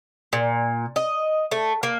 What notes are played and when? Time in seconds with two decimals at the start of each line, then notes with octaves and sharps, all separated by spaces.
0.33 A#2
0.96 D#5
1.51 A3
1.83 A#3